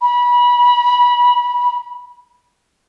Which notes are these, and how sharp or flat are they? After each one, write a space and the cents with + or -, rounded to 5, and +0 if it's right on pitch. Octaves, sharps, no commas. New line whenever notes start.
B5 -25